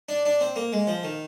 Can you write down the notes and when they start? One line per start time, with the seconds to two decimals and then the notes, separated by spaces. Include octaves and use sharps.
0.09 D4
0.25 D4
0.41 C4
0.56 A#3
0.73 G#3
0.87 F3
1.03 D#3